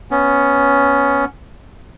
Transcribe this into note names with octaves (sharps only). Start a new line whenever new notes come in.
B3 C#4